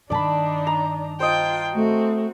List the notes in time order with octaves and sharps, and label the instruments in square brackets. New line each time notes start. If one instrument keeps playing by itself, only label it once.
[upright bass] G2 D#3 [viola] D4 D#4 [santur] D5 A5 B5
[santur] A#5
[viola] F4 G5 [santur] C5 D#5
[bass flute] A3 [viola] C4 F#4